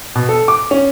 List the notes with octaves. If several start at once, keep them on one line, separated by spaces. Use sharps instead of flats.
B2
A4
D6
C#4